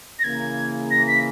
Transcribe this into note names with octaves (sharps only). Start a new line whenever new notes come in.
A#6
C#3 E3 A#3 G#6
A#6
B6